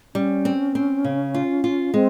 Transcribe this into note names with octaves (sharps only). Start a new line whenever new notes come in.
G3 C#4
C4
C4
C#3
F4
F4
G#3 C4